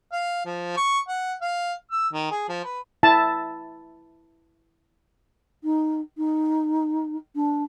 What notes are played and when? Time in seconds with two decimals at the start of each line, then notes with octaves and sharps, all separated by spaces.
0.12 F5
0.46 F3
0.77 C#6
1.08 F#5
1.42 F5
1.92 E6
2.13 D#3
2.31 G#4
2.49 F3
2.65 B4
3.03 E4 A5
5.62 D#4
6.17 D#4
7.35 D4